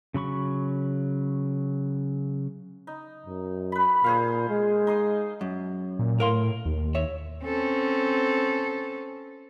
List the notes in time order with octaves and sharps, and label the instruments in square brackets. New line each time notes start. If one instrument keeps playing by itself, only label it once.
[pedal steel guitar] C#3 F#3 B5 C#6
[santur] D#4
[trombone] F#2
[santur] B4 B5
[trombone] A#2 [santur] G#4 C5 F5
[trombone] G#3
[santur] D#4 C6 D#6
[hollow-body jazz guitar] F#2
[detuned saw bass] A#2
[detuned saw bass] A2 [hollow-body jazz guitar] A#4 F5 C6
[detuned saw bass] D#2
[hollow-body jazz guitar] C#5 E5
[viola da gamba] C4 C#4 A4